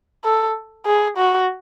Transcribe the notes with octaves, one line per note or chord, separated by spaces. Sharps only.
A4
G#4
F#4